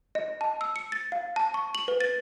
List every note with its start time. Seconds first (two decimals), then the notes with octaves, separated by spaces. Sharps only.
0.15 D#5
0.41 A5
0.61 E6
0.76 C#7
0.92 A6
1.12 F5
1.36 A5
1.54 C#6
1.75 F#7
1.88 B4
2.01 A6